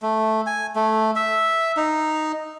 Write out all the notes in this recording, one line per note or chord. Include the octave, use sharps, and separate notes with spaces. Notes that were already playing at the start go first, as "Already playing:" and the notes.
A3
G#5
A3
E5
D#4